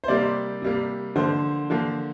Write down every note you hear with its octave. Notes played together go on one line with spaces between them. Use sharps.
C5
C3 G3 A#3 D5
C3 G3 A#3
D3 F3 A#3 C5
D3 F3 A#3